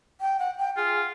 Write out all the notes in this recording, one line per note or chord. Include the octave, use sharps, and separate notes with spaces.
G5
F#5
G5
F4 G#4